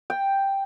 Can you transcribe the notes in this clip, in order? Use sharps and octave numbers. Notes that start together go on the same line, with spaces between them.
G5